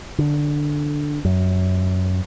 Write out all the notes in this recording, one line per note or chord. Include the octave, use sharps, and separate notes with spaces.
D3
F#2